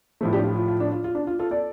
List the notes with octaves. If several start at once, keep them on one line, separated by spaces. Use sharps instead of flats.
A2 F3 A3
D4 G4
F4
F4
F4
D4
F4
F4
D4
F4
F4 A4
A4 D5